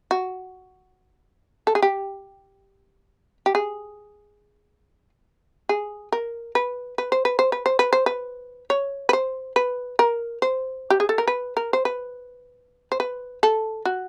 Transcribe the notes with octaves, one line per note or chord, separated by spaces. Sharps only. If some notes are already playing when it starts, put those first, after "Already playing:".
F#4
A4
G#4
G4
G4
G#4
G#4
A#4
B4
B4
C5
B4
C5
B4
C5
B4
C5
B4
C#5
B4
C5
B4
A#4
C5
G4
G#4
A4
A#4
B4
A#4
C5
B4
C5
B4
A4
F#4